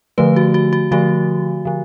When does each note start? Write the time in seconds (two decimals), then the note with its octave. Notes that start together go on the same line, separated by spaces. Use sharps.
0.18 D3 F3 A3 B4
0.36 F#4
0.54 F#4
0.73 F#4
0.91 D3 F3 A3 F#4
1.65 D3 F3